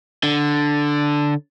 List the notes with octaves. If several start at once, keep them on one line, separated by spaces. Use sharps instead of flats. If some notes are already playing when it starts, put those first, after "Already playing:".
D3